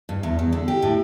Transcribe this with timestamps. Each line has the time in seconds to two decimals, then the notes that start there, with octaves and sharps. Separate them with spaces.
0.09 G2
0.23 E2
0.39 E2
0.52 D3
0.68 G4
0.82 A2